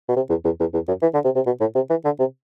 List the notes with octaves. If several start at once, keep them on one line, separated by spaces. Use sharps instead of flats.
B2
C3
E2
E2
E2
E2
F#2
E3
D3
C3
C3
B2
A2
C3
E3
D3
C3